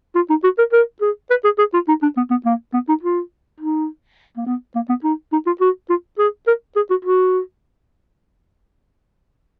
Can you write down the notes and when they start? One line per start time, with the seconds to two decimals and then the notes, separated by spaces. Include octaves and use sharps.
0.15 F4
0.30 D#4
0.44 F#4
0.58 A#4
0.73 A#4
1.01 G#4
1.31 B4
1.44 G#4
1.59 G#4
1.74 F4
1.88 D#4
2.02 D4
2.17 B3
2.30 B3
2.45 A#3
2.74 B3
2.89 D#4
3.03 F4
3.60 D#4
4.37 A#3
4.46 B3
4.75 A#3
4.89 B3
5.04 D#4
5.32 D#4
5.47 F4
5.61 F#4
5.90 F4
6.18 G#4
6.47 A#4
6.76 G#4
6.90 F#4
7.05 F#4